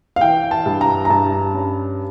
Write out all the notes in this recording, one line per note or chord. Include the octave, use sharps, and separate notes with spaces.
F5
E3 G5
A5
G2
A#5
A#5
G2 A5
C#4